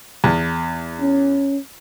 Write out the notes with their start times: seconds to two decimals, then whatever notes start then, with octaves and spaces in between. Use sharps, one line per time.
0.24 E2
1.01 C#4